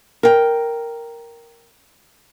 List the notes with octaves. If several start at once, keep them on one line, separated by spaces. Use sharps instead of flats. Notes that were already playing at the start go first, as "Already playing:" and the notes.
A#4 G5